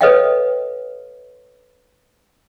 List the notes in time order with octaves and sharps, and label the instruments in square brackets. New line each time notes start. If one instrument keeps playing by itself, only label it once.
[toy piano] A4 B4 C#5 D#5 F5 G5